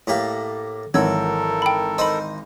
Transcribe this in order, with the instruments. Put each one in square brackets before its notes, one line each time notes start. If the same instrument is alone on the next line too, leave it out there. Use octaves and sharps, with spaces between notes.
[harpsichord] A2 A#3 G4
[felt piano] G#1 E3 [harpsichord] F#3 [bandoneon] A4 A#4 [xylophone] E6 G#6
[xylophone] G5 B5
[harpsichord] D#4 C5 [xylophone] B5 E6